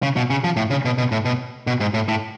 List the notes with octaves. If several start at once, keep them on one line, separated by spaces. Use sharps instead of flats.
C#3
B2
C#3
F3
A2
C#3
B2
B2
A2
B2
B2
G#2
A2
A2